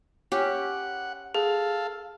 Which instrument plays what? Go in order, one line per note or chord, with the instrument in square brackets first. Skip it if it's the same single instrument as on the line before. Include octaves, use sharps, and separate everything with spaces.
[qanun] C#4 G4 [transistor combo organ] F#5
[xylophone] G#4 [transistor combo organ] A4 F5